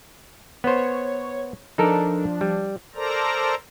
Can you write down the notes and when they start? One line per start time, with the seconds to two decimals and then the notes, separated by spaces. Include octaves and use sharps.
0.64 B3 C5 C#5
1.78 F3 D4 D#4 A4 A#4
2.41 G3
2.95 A4 A#4 C5 D5 A#5